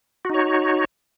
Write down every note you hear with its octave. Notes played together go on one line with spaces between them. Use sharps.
D#4 F#4 C#5